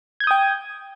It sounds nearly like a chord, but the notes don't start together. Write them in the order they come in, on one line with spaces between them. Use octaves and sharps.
G#6 G6 D#6 G5